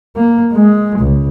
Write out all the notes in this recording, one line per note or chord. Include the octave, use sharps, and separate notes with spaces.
A#3
G#3
C#2